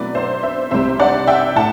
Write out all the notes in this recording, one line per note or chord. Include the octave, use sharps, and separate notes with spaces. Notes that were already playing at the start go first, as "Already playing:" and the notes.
Already playing: B2 F#3 A3 C4 E4 B4 D5
C5 E5
C5 E5
C2 C3 G3 C5 E5
D5 F#5
E5 G5
A2 F#5 A5